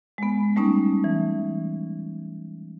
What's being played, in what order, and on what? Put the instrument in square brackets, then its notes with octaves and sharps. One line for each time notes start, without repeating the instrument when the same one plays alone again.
[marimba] G#3 B3
G3 A3 C#4 D#4
E3